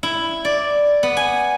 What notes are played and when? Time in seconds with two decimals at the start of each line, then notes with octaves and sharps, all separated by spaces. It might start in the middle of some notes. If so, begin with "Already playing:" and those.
0.03 E4
0.45 D5
1.03 B3
1.17 G#5